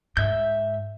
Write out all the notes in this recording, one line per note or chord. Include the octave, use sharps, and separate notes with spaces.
G#2 E5 G6